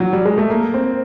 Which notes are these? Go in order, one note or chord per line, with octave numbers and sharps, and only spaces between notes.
F#3
G3
G#3
A3
A#3
C4